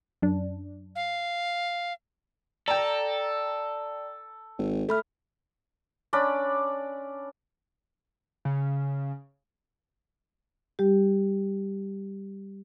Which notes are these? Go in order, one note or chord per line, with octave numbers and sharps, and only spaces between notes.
F#2 D4
F5
A4 D5 G5 A#5
G#1
A3 A4 B5 F6
C#4 D4 D5 B5
C#3
G3 G4